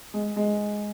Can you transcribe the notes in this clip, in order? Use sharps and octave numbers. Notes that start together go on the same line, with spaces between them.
G#3
G#3